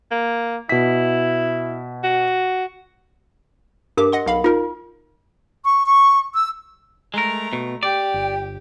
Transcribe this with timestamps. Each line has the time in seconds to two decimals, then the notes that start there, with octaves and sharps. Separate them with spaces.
0.11 A#3
0.69 B2 E4 B6
2.03 F#4
3.97 G2 G4 A#4 D6
4.12 D#5 F#5 C6
4.26 B1 F5 B5
4.44 D#4 F4 A#4
5.63 C#6
5.85 C#6
6.32 E6
7.14 G#3 A3 A#4 A#5
7.53 B2
7.83 G4 D5 G5
8.14 G1